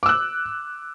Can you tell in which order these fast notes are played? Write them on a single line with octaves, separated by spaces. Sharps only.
D6 E6 F#6